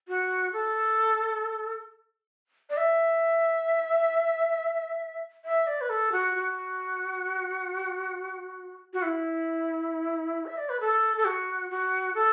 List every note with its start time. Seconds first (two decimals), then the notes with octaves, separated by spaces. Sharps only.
0.08 F#4
0.53 A4
2.70 D5
2.77 E5
5.45 E5
5.67 D5
5.81 B4
5.90 A4
6.12 F#4
6.35 F#4
8.93 F#4
9.02 E4
10.46 E5
10.57 D5
10.69 B4
10.80 A4
11.17 A4
11.26 F#4
11.70 F#4
12.15 A4